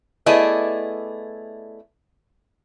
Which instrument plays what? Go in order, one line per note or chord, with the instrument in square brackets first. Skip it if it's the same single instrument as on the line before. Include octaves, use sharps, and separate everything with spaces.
[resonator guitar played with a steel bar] A3 B3 E4 G#4 D5 D#5